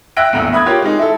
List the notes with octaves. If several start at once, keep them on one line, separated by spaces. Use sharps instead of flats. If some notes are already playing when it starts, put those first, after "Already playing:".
E5 G5 E6 F#6 A#6 D7
A#1 E2 A2 A#5
E5 B5 D#6 F#6 G#6
F4 G4 A#4 C#5
G#3 D#4
E4 A4